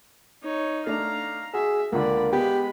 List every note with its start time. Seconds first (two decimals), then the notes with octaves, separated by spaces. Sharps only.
0.43 D#4 C#5
0.86 A3 D4 F5 A#5
1.54 F#4 G#4 E5
1.92 C#2 D3 A#3 D5 B5
2.33 G#3 B3 G4 B5